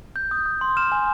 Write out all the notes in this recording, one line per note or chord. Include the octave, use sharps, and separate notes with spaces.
G6
D#6
D#6
C6
F6 E7
G#5